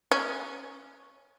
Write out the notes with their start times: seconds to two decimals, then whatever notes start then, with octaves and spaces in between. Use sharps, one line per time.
0.11 C#4